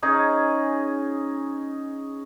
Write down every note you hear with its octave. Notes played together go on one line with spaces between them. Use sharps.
C#4 D#4 G#4